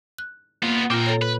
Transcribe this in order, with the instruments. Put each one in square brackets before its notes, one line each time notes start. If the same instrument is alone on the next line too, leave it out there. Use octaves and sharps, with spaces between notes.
[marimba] F#6
[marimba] A#3 [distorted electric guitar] B3 F4
[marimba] A#2 F4 [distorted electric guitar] C4 A#4
[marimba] A4 C#5
[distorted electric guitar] B4